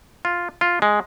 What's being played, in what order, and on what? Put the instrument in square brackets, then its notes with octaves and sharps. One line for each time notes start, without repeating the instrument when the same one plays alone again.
[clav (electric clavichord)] F4
F4
G#3